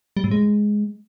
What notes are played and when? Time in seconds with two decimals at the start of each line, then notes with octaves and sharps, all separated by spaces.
0.17 G3
0.24 A2
0.31 G#3